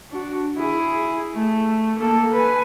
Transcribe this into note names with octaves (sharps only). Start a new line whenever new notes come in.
D4 F#4
E4 G#4
A3
A#3 A4
B4 G#5